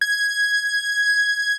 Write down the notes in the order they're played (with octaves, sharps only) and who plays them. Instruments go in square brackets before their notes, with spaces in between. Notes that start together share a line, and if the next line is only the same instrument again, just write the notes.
[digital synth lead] G#6